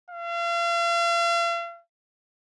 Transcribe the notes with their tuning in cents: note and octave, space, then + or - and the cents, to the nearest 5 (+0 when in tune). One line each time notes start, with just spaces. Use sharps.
F5 -40